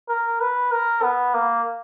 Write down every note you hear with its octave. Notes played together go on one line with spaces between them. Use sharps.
A#4
B4
A#4
B3
A#3